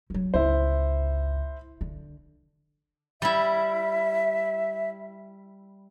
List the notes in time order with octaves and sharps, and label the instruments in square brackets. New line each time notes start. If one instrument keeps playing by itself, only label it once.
[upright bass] F3 F#3
[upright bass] G1 C#2 [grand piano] E4 C5
[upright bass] D3
[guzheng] G3 E4 [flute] E5